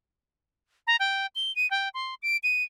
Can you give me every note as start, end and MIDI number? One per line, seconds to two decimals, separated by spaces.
0.87 0.96 82
1.00 1.26 79
1.35 1.54 103
1.56 1.69 99
1.71 1.89 79
1.94 2.15 84
2.22 2.37 98
2.43 2.63 99